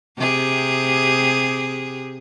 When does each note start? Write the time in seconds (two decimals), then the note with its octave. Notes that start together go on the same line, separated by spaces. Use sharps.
0.17 C3 G4 G#4